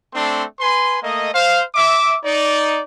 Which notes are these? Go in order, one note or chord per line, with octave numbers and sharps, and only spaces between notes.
A3 C4 D4 C6
B4 G#5 C6
A3 A#3 D#5
C5 F5
E5 D6
D#4 D5